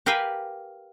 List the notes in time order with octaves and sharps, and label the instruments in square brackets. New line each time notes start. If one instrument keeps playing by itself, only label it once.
[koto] G4 A#4 B4 F5 G5 G#5